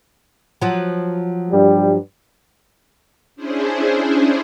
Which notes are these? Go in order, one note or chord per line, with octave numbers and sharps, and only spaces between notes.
F3 F#3
G2 G3
C#4 D4 E4 G#4 C5